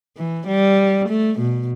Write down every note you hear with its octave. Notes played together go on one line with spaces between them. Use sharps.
E3
G3
A3
B2